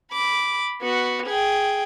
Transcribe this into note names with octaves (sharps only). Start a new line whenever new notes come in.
B5 D6
B3 F#4
G#4 G5